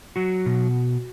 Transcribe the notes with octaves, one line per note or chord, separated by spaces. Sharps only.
F#3 F#4
B2